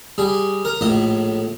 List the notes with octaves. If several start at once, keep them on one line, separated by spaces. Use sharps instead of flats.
G3 G#4
A#4
A#1 A2 D#5